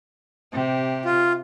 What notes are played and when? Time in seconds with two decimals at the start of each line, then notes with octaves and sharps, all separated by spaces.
0.52 C3 G4
1.05 F4